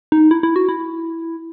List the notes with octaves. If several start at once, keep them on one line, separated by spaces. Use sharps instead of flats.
D#4
E4
E4
F#4
E4